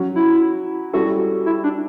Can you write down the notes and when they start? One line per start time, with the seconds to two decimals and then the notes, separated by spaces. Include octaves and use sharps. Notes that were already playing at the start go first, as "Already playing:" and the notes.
Already playing: F#3 C#4 F#4
0.16 E4
0.93 G3 C#4 E4 F#4 A4
1.46 E4
1.64 D4